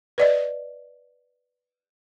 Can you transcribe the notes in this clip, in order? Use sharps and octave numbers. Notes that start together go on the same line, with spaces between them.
B4 D5 D#5